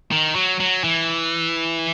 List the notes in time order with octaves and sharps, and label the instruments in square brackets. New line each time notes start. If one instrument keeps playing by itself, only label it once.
[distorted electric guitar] D#3
F#3
F#3
E3